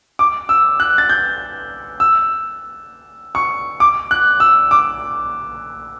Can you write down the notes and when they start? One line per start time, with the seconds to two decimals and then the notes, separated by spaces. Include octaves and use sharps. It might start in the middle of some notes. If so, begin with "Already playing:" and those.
0.19 D6
0.49 E6
0.80 F#6
0.98 A6
1.10 G6
2.00 E6
3.35 C#6
3.80 D6
4.11 F#6
4.40 E6
4.71 D6